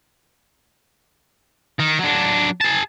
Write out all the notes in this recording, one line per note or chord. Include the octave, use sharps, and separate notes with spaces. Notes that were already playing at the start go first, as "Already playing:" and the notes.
D#3
F#3 D4
G#4 A5